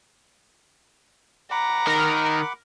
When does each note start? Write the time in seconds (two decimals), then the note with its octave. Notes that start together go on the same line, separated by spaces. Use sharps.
1.51 F#5 A#5 B5 D6
1.87 D#3 A#4